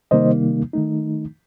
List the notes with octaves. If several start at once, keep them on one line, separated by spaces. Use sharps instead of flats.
C3 D#3 G3 A#3 D#4 C5 D#5
D#3 A3 D#4